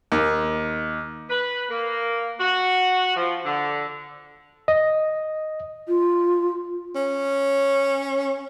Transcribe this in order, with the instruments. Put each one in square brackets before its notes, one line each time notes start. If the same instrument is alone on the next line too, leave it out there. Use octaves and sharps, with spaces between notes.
[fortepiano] D#2
[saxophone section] B4
A#3
F#4
F3
D3
[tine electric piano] D#5
[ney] F4
[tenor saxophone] C#4